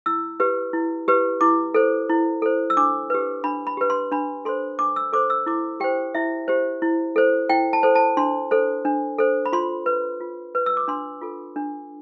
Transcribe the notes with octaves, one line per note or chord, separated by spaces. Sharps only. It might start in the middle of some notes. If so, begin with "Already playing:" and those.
E4 E6
G4 B4
E4
G4 B4
E4 D6
A4 C5
E4
A4 C5
E6
D4 D6
G4 B4
D4 B5
B5
G4 B4
C6
D4 B5
A4 C5 C6
D4 D6
E6
A4 C5 D6
E6
E4 D6
G4 C5 G5
E4 E5
G4 C5
E4
A4 C5
E4 G5
A5
A4 C5
A5
D4 C6
A4 C5
D4
A4 C5
B5
F4 C6
B4
F4
B4
E6
D6
D4 C6
F4 A4
D4